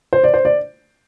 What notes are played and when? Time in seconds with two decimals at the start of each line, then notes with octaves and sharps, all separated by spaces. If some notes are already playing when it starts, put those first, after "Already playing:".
0.13 C5
0.24 D5
0.34 C5
0.45 D5